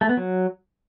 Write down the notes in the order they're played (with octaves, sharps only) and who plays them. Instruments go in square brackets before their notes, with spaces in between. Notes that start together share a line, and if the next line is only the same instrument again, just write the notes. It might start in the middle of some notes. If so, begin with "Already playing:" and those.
[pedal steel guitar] A3
B3
F#3